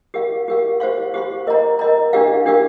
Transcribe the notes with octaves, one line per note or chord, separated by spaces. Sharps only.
G4 A#4 F5
G4 A#4 F5
G4 C5 F5 C6
G4 C5 F5 C6
A#4 D#5 A#5
A#4 D#5 A#5
D4 G4 A#4 F5
D4 G4 A#4 F5